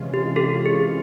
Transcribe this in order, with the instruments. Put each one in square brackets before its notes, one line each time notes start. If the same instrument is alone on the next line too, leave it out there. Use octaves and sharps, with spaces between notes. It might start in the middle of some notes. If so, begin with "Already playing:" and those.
Already playing: [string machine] C3 E3 G#3 C#4 F4
[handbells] G4
G4 A4
G#4